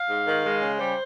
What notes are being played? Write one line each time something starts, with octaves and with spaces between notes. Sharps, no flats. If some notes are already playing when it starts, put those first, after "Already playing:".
Already playing: F5
G#2
D#3
G#3
C#3
G3 C5